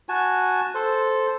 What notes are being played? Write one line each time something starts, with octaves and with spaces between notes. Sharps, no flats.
F#4 G#5 A5
A4 C5